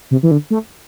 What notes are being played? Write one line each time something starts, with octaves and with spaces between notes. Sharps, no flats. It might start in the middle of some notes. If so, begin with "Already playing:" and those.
C3
E3
D3
A3